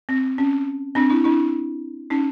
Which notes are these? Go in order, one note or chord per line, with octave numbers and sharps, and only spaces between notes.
C4
C#4
C4 D4
D4 E4
D4 E4
C#4 D#4